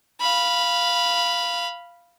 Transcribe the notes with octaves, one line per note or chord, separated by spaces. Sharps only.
F5 B5